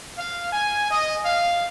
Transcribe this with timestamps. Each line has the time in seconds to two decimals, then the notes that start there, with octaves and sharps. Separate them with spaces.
0.18 F5
0.52 G#5
0.90 D#5
1.26 F5